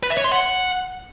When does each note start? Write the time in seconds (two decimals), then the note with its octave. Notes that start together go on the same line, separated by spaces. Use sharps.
0.03 B4
0.10 E5
0.17 C#5
0.24 C6
0.32 F#5